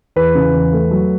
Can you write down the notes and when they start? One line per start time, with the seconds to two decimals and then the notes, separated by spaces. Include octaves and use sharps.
0.16 E2 B4
0.35 C#3
0.54 E2
0.73 A3
0.91 F#3